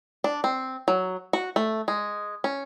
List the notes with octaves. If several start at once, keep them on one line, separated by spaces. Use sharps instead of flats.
D4
C4
F#3
F#4
A3
G#3
C#4